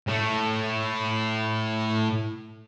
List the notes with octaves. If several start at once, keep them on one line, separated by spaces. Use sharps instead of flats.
A2 A3